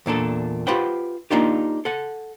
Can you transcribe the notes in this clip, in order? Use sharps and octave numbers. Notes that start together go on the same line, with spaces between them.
E2 A#2 D4 A4
F4 G4 B4 C5 F#5 G5
A#3 D4 D#4 F4 G4
A4 F#5